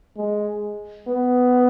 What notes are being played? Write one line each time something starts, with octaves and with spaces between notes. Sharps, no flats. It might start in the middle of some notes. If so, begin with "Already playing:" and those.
G#3
B3